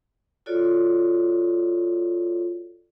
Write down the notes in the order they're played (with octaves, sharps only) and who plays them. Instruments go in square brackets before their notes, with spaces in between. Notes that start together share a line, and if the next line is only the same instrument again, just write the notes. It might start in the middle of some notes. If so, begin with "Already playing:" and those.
[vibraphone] F4 F#4 A4 C#5 D5